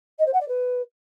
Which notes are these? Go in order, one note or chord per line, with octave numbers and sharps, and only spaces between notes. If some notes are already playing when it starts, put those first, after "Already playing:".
D#5
C5
F#5
D5
B4